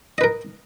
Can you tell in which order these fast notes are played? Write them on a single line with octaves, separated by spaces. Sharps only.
D#5 B4 A#4